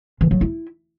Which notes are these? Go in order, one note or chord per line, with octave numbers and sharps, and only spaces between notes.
E3
F#3
E4